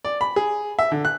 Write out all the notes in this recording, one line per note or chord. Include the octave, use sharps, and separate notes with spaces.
D5
B5
G#4
E5
D3
F#6